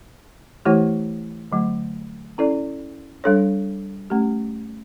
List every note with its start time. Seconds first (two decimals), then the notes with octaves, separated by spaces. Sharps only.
0.65 E3 A3 E4 G4 C#5
1.52 D3 F#3 A3
2.38 C#4 E4 A4 D5
3.24 G3 D4 A4 C#5
4.10 A3 C#4 G4